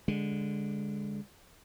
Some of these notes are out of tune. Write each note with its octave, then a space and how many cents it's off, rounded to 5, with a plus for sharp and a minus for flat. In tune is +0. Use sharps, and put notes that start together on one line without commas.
D3 -10 G#3 -15